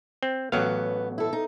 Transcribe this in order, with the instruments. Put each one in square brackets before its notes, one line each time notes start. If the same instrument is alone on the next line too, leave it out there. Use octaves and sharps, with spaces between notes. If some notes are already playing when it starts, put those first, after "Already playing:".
[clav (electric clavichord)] C4
[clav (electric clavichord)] A1 F#3 F5 [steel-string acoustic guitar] B3
[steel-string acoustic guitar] E4 A4
D#4